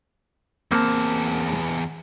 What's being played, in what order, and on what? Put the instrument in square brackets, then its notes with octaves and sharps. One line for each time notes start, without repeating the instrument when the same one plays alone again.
[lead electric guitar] E2 A5 [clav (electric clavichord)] A#3 C4